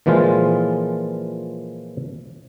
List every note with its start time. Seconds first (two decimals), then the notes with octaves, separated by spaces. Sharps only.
0.06 A#2 E3 F3 G#3 F4